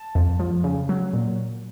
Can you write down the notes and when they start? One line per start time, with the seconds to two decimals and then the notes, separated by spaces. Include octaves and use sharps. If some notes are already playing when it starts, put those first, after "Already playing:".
Already playing: A5
0.15 F2
0.40 F3
0.64 C#3
0.89 F#3
1.13 A#2